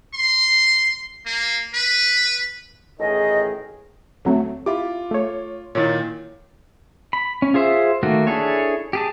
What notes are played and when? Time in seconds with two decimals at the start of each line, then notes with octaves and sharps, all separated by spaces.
0.14 C6
1.26 A#3
1.74 B4
2.99 A1 D#3 G#4 D#5
4.25 D2 F#3 A3 C4
4.66 E4 F4 G4 D6
5.11 A3 C#5
5.75 A#2 D#3 E4 C#5 A6
7.13 B5
7.42 C#4
7.54 F4 G#4 C5 E5
8.03 D#3 A3 A#3 F#4
8.27 D4 E4 G#4 A4 C#5
8.93 G4 G#4 A5